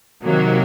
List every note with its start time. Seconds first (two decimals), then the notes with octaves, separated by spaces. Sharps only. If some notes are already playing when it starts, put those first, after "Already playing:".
0.24 C3 D#3 F#3 A#3